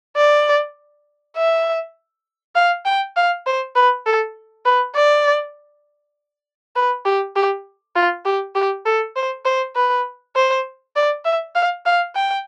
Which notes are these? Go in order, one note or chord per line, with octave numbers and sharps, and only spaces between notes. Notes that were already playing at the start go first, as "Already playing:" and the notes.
D5
E5
F5
G5
F5
C5
B4
A4
B4
D5
B4
G4
G4
F4
G4
G4
A4
C5
C5
B4
C5
D5
E5
F5
F5
G5